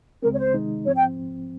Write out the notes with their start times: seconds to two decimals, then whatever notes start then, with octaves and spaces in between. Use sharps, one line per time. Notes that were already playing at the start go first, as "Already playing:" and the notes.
0.23 C#2 C#3 G#3 C4 A#4
0.34 C#5
0.38 C5
0.54 C3 D#3 G#3 D#4
0.85 G#2 F3 C4 C#5
0.96 G5